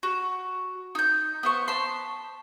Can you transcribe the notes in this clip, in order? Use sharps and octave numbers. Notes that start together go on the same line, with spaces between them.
F#4
D#4 G6
B3 C5 C#6
A5 B5 C6